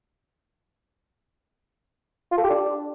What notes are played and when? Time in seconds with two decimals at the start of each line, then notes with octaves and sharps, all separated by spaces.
2.32 F4
2.38 A4
2.44 G4
2.50 D4